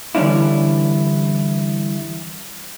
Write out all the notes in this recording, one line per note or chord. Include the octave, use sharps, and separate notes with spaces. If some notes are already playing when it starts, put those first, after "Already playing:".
D3 E3 G3 C#4 D4 E4